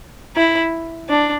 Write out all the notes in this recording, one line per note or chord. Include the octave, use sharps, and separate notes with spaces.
E4
D4